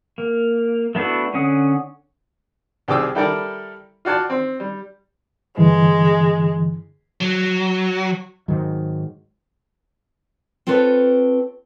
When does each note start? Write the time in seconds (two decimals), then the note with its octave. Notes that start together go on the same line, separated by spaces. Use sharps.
0.18 A#3
0.95 A3 B3 D4 E4 F#4
1.34 D3 C#4 F#5 D#6
2.88 C2 G4 G#4 D6 E6
3.15 G3 E4 G4 A4 A#4 D5
4.05 F4 F#4 D5 G5 A5
4.30 C4
4.60 G3
5.58 G2 D3 E3 G#3
7.20 F#3
8.48 G#2 D#3 F#3
10.67 C4 F4 A4 B4 C#5